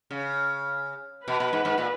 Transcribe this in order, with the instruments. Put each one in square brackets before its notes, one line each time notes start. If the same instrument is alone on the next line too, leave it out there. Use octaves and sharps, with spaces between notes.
[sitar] C#3
[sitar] B2 [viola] B4
[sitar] B2
G#2
G#2
A#2